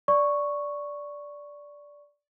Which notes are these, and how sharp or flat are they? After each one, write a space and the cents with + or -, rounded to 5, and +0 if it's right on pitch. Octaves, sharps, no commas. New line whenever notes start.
D5 -10 C#6 +0